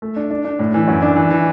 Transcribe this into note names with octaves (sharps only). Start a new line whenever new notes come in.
A3
D4
D4
D4
A2
E3
F#2
D4
E3
E3